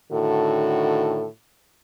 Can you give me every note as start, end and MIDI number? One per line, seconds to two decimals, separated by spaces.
0.12 1.26 45
0.12 1.26 50
0.12 1.26 51
0.12 1.26 66
0.12 1.26 69